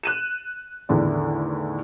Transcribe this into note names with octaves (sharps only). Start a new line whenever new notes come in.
F#6 D#7 E7
E2 A2 D3 D#3